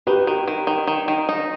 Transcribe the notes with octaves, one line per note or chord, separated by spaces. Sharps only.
D#3 G4 B4
D#3
D#3
D#3
D#3
D#3
D#4